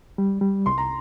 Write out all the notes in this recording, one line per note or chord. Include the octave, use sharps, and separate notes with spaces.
G3
G3
C2 C6
A#5